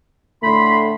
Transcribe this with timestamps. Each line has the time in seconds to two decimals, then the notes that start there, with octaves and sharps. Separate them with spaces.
0.43 A2 D3 A3 B5 C6